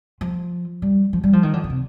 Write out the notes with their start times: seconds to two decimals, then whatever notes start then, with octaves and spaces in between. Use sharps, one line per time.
0.21 F3
0.82 G3
1.13 F3
1.24 G3
1.33 F3
1.43 D#3
1.53 D3
1.64 D3
1.70 C3